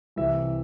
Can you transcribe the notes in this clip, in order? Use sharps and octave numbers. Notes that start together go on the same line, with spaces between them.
C2 C3 E3 E5